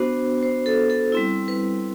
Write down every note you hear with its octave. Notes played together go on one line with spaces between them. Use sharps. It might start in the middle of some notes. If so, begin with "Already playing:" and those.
Already playing: B3 D4 F#4 C5
C5
A4
A4
G3 C4 E4
B4